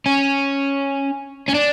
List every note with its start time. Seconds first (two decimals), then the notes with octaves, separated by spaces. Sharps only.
0.06 C#4
1.49 C#4
1.55 D4